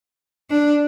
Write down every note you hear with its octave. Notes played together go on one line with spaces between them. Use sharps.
D4